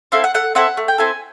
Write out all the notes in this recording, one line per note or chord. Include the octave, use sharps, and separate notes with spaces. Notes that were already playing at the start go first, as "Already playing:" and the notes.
C4 E4 A4 F5
F#5
A3 F#5
C4 E4 A4 F#5
A3
G5
C4 E4 A4 G#5